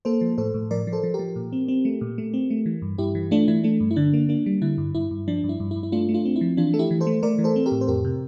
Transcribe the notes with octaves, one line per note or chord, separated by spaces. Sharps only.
A#3 A4 C5
F3
A2 A4 C5
A2
F3 A#4 D5
F3
A4 C5
F3
G4 A#4
F3
A#2
C4
C4
A3
A#2
A3
C4
A3
E3
G2
G2 E4 G4
E3
A3 D4 F4
E3 E4
A3 D4
G2
E4
D3 D4
A#3
A#3 D4
G3
D3 E4
G2
G2 E4
G2
F3 D4
G2
E4
G2
E4
G2
E4
A3 D4 F4
A3
D4 F4
C4
E4
F3
E3 D4 F4
A3 A4
E4 G4
E3
A4 C5
A3
A3 A#4 D5
E3
A4 C5
C4
G4 A#4
A2
C5
F2 G4 A#4
C3